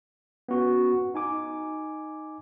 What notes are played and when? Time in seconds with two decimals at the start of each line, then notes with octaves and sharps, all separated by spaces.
0.49 B3 C#4 F#4
1.14 D#4 G#5 D6